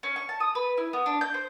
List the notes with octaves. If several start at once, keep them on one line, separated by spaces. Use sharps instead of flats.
C#4
C#6
A5
D#6
B4
E4
B3
D4
G6
C5